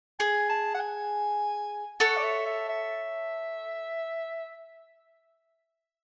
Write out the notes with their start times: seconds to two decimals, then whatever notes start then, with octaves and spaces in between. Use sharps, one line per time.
0.19 G#4 G#5
0.50 A5
0.74 F#5
0.80 G#5
2.00 A4 C#5 F#5
2.17 D5
2.23 E5
2.46 E5
2.69 E5